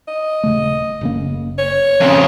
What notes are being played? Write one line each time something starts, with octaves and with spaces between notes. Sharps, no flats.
D#5
D#1 C#3 A3
F#1 C#3 A#3
C#5
F2 C#3